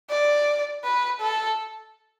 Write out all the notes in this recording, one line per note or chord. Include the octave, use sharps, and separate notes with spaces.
D5
B4
A4